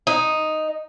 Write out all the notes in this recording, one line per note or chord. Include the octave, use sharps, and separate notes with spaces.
D#4